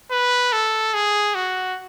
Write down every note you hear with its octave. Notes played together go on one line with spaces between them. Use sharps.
B4
A4
G#4
F#4